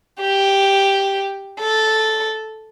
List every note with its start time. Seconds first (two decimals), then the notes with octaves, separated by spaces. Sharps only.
0.22 G4
1.60 A4